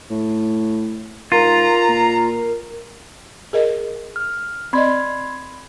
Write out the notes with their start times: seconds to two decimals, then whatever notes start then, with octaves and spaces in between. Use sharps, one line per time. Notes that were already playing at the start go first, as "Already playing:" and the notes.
0.10 A2
1.32 G#2 F4 A#4 A#5
1.88 A#2
3.53 G#4 A#4 D#5
4.16 F6
4.73 C4 D5 D#5 B5 C6 G#6